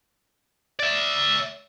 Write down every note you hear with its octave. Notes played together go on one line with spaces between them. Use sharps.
D5 E5